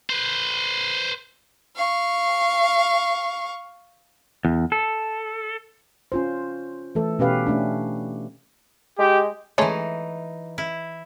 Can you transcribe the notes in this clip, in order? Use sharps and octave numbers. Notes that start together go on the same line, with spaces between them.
B4 C5
F5 C#6
E2
A4
C#4 F4 C5
E3 A3 A4
B2 C#4 G4 B4 F5
A3 C#4 D4
G#3 G4
E3 G#3 A3 C#4 D#4
E4